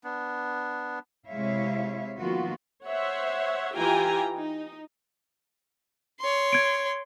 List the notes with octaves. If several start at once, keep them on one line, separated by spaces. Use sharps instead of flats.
B3 D4
C3 G#3 E4 C#5 E5 F5
D#3 F3 A#3 B3 F4 F#4
C5 C#5 E5 F#5
E3 F4 G4 G5 G#5 A#5
D#4
C#5 C6
G#6 D7